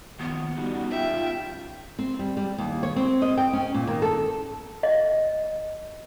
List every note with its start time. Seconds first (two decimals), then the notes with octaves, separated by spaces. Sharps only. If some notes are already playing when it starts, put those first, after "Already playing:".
0.19 D#3 F3 A#3 B3
0.57 G3 C#4 D#4 F#4 G4
0.90 F4 E5 G5
1.99 C4
2.19 G3
2.37 G3
2.58 D#2
2.83 C#5
2.96 C4
3.22 D#5
3.37 G5
3.53 C#4
3.74 A#2
3.87 D#3
4.02 A4
4.83 D#5